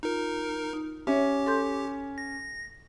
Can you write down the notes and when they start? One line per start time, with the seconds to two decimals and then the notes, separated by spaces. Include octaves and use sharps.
0.03 D#4 F4 A#4
0.73 D#4
1.07 C#4 G4 C#5 E5
1.46 A4 C6 G6
2.18 A#6